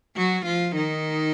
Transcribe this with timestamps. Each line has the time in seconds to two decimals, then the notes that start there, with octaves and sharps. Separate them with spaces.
0.16 F#3 F#4
0.46 F3 F4
0.76 D#3 D#4